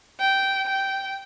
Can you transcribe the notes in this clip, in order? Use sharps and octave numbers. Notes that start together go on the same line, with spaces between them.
G5
G5